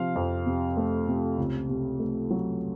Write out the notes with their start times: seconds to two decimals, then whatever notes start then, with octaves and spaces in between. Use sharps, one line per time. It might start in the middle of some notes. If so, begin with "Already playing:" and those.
Already playing: C3 F3 F5
0.16 F2
0.46 C3
0.77 A3
1.08 C3
1.37 C#2
1.69 C3
2.00 A3
2.30 F#3